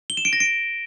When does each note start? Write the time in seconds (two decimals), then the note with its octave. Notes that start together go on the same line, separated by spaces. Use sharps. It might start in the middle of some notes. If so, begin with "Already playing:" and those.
0.10 G7
0.17 E7
0.25 D7
0.33 A#6
0.40 D7